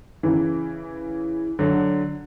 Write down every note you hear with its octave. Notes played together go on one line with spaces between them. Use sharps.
C#3 E3
D3 F#3